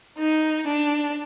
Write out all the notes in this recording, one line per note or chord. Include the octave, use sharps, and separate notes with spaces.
D#4
D4